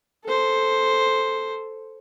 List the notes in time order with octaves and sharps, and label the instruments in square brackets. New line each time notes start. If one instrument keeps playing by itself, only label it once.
[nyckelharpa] A4 C5